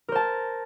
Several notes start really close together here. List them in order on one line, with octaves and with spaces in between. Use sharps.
A#4 C5 A5